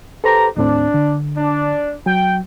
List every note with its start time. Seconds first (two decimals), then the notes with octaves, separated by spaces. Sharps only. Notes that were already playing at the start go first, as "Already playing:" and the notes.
0.24 G4 A4 B4 C5 A#5
0.57 D#2 A2 C4 D4
0.94 D3
1.37 D4
2.06 F#3 G5